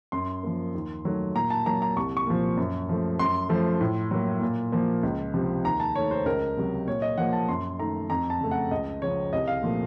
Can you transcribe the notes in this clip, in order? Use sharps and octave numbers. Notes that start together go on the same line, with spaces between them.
F#2 C6
F3 A#3
D#2
D#3 F#3 A3
A#2 A#5
A5
F#3 A#3 A#5
A#5
C2 C#6
C#6
A#2 F3
F#2
F3 A3
F#2 C6
F3 A3
A2
F#3 A#3
A#2
F3 A#3
C#2
C3 F3
D#2 A#5
A5
D#3 A3 C#5
C5
C#2 A#4
C3 F#3
A#2 C#5
D#5
F3 A#3 F#5
A5
F#2 C6
D#3 A3 A#5
F2 A#5
A5
C#3 A3
F#5
C#2 D#5
C#3 F3 C#5
C2 D#5
F5
A#2 F3 A3